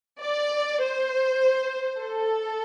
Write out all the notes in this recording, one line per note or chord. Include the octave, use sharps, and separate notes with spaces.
D5
C5
A4